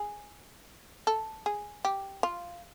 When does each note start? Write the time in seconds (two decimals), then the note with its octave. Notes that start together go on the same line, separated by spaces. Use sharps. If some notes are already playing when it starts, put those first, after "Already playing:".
Already playing: G#4
1.07 A4
1.46 G#4
1.85 G4
2.23 F4